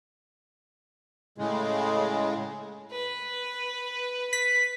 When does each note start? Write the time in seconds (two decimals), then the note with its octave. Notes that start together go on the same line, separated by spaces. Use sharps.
1.38 A2 C#3 G#3
2.92 B4
4.33 B6